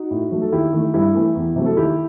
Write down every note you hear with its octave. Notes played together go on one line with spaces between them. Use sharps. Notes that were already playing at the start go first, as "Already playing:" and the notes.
Already playing: D#4 F#4
A2
F#3 A3
A4
D#2 E4 G4
D#3 A3
G2 E4 G4
E3 A3
E2
C3 F#3 A3
A4
D#2 E4 G4